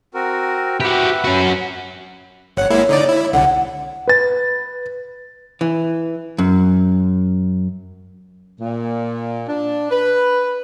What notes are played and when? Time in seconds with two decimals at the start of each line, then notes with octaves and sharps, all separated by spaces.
0.14 C4 F#4 A#4
0.80 F#4 G4 B4 E5
1.25 C#4 F#4
2.57 G#1 C#5 F#5
2.70 G#3 A#3 E4
2.89 D3 D#4 D5
3.09 E4
3.33 C2 D3 F#5
4.07 B4 A6
5.61 E3
6.38 F#2
8.60 A#2
9.48 D4
9.91 B4